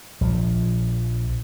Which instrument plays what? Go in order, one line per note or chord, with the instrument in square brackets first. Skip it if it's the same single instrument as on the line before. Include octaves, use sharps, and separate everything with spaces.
[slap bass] A#1 F3